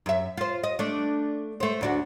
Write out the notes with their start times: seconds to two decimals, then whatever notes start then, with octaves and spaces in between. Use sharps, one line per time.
0.06 F#2 E5
0.37 F4 C5
0.64 D#5
0.79 A3 D4
1.60 A3 C5
1.81 D2 D4 F#4